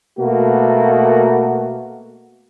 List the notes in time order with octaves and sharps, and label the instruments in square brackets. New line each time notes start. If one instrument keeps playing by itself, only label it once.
[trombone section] B2 A3 A#3 F#4